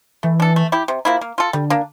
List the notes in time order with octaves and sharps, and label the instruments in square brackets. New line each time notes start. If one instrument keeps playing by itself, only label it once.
[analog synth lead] E3 [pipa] A3
[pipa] D4 A4
A3
E4 G4
C3
F3 A#3 E4
A#3
F4 A4
[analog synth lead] D3 [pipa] G3
[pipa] A#3 D4